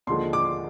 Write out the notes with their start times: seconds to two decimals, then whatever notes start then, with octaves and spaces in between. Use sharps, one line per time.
0.07 D#2 D3 F3 G#3 C6
0.33 D6